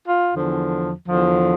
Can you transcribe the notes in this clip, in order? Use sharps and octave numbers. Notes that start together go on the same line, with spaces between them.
F4
E2 D3 F3
E2 D3 F3